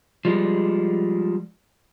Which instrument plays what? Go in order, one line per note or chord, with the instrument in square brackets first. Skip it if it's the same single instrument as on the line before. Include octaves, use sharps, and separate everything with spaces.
[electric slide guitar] F3 G3 G#3